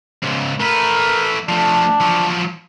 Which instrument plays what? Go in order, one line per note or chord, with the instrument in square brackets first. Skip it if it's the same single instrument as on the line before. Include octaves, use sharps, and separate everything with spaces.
[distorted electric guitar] C#2 G#2
[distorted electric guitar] A3 B4 [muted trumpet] A#4
[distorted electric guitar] F3 A3 [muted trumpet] D4
[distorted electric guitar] F3 F#3